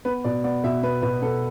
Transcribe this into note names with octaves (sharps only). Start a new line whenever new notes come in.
B3 B4
B2 D5
B3 D5
B2 E5
B3 B4
B2 B4
B3 A4